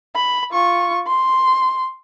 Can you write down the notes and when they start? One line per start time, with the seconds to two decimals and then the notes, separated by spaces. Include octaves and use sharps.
0.15 B5
0.51 F4 C#6
1.07 C6